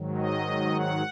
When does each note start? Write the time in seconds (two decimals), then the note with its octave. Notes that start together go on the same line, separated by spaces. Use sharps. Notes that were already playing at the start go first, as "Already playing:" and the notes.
Already playing: G#2 D#3 F#3
0.17 D#5
0.74 F#5